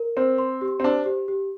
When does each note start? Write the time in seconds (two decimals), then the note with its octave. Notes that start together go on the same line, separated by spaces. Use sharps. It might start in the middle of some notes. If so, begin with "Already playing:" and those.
Already playing: A#4
0.17 C4 C5
0.38 C6
0.61 G4
0.80 C4
0.84 D4 C5
1.06 G4
1.28 G4